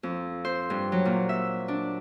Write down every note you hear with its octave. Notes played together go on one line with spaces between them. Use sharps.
F2
C5
G2
F#3
A#2
E5
D4